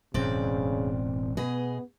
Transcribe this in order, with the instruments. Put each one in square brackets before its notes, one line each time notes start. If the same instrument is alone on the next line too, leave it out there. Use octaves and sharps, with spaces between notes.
[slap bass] E1 F#2 [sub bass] A2 [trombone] C#3 [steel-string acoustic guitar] C4 D5
[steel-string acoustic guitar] B2 G#4 D#5 [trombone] B3